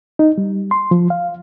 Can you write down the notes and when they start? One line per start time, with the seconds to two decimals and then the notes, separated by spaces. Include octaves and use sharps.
0.19 D#4
0.38 G3
0.71 C6
0.91 F3
1.10 F5